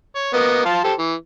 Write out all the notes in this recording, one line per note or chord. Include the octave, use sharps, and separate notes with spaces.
C#5
A#3 B3 D#5
F4 F5 A5
G4 A4 C5
E3